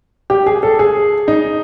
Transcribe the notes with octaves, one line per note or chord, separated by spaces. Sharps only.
G4
G#4
A4
G#4
D#4